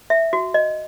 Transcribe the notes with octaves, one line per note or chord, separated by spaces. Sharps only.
E5
F#4
D#5